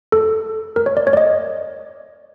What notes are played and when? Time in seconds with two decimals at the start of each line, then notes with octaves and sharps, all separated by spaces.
0.12 A4
0.76 A#4
0.86 C#5
0.97 D5
1.07 C#5
1.13 D5
1.17 D#5